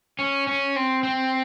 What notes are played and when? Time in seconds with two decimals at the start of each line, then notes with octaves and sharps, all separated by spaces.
0.19 C#4
0.47 C#4
0.76 C4
1.03 C4